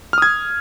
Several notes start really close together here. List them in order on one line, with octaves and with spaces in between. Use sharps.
F6 D#6 G#6